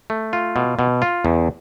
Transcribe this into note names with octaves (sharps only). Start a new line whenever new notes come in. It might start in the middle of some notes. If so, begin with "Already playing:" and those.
A3
F4
B2
B2
F4
E2